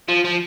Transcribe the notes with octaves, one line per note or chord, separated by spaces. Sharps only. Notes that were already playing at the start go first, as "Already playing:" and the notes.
F3
F3